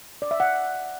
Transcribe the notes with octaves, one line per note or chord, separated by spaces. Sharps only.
D5
E5
F#5